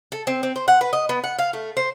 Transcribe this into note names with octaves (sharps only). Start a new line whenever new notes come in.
A4
C4
C4
C5
F#5
B4
D#5
B3
F#5
F5
A3
C5